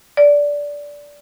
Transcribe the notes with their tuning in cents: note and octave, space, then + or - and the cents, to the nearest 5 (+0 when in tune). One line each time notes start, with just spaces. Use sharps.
D5 -15